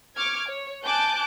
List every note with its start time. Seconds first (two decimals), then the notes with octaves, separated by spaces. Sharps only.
0.16 C#6 D6 F6 G#6
0.48 C#5
0.84 G#5 A5 D6 F#6 G6